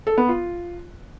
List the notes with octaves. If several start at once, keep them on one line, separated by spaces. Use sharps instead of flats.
A4
B3
F4